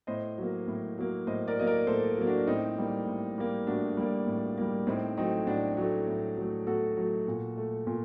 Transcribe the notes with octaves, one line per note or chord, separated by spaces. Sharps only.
A2 C5 D#5
F#3 A#3
A2
F#3 A#3
A2 C5 D#5
A#4 D5
F#3 A#3 D#5
A#4 D5
A2 A4 C5
F#3 A#3
D4 F#4
A2 C4 D#4
G3 A#3
A2
G3 A#3
A2 D4 F#4
G3 A#3
A2
G3 A#3
A2 C4 D#4
F#3 A3 C4 D#4
A2 D4 F#4
F#3 A3
A2
F#3 A3
A2 F#4 A4
F#3 A3
A#2
A3
A#2